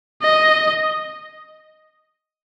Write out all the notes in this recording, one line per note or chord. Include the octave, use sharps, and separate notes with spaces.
D#5